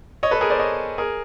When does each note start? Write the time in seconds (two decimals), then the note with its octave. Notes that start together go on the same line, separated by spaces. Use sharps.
0.23 C#5 D#5
0.31 A4 B4
0.41 G#4 A#4
0.50 C5 D5
0.59 C#5 D#5
0.98 G#4 A#4